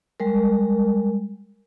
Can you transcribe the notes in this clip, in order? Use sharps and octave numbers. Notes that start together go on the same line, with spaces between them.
G3 G#3 A#4